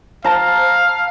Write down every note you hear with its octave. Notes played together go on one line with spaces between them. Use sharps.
C5 F5 A5 A#5